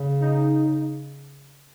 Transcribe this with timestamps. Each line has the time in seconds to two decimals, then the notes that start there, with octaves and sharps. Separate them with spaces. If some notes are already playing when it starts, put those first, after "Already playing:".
Already playing: C#3
0.20 D#4